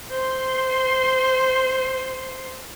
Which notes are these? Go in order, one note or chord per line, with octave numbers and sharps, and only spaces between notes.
C5 C6